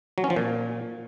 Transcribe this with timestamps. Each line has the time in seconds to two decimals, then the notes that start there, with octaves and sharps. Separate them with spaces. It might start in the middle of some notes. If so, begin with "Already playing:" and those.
0.18 F#3
0.24 C#4
0.30 F3
0.36 A#2